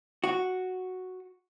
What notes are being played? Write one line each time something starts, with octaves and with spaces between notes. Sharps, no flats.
F#4